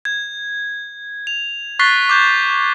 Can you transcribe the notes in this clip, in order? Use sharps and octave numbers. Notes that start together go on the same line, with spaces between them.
G#6
F7
C#6 F#6 A6 B6 C7 G7
D6 G6 G#6